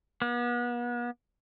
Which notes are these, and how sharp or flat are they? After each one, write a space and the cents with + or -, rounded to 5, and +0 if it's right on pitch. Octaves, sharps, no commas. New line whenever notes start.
B3 -40